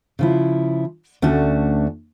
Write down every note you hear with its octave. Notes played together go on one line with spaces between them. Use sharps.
C#3 F3 E4
D2 A3 C#4 D4 F#4